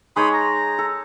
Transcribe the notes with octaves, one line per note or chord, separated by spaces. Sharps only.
G#3 D#4 C#5 B5 C6 D#6
A#5
A4